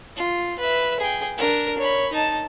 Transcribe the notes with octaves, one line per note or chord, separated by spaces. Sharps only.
F4
B4 E5
G#4 G5
D4 A#4
C#5 B5
D#4 A5